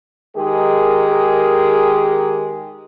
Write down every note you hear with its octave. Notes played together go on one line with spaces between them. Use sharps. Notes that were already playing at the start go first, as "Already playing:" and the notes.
D#3 G#3 G4 G#4 A#4